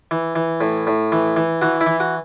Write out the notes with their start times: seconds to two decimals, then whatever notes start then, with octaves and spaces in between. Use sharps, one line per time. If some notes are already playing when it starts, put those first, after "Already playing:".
0.11 E3
0.35 E3
0.61 A2
0.87 A2
1.12 E3
1.36 E3
1.62 E3 F#4
1.81 E4
1.86 E3
2.00 F#4